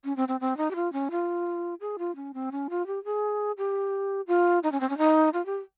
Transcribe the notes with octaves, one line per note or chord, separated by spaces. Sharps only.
C#4
C4
C4
C4
D#4
G4
F4
C#4
F4
G#4
F4
C#4
C4
C#4
F4
G4
G#4
G4
F4
D#4
C#4
C4
C#4
D#4
F4
G4